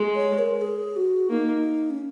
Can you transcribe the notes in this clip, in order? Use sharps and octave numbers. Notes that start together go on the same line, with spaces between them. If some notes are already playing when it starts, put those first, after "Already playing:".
Already playing: G#3
C#5
A#4
G#4
F#4
A#3 D#4
C#4